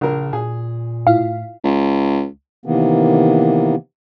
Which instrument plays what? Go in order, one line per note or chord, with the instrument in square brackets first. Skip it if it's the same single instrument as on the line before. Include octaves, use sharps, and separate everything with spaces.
[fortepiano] A#1 A#4 [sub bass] C#3
[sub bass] A#2 [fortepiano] G#4
[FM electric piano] A2 E4 F4 [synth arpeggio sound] F5
[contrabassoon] C#2
[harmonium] C3 D#3 E3 A#3 B3